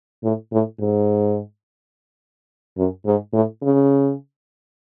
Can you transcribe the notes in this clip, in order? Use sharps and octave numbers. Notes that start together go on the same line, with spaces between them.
A2
A2
G#2
F#2
G#2
A2
C#3